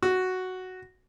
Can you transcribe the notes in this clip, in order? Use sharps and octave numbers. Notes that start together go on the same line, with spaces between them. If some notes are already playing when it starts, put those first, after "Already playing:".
F#4